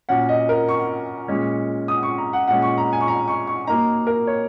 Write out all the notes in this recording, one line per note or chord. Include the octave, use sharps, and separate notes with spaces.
A#2 F#3 C#4 F#5
D#5
A#4
C#6
A#2 G#3 C#4
D#6
C#6
A#5
F#5
A#2 G#3 C#4 F#5
C#6
A#5
G#5
C#6
A#5
C#6
C#6
F#3 A#3 D#4 A#5
A#4
C#5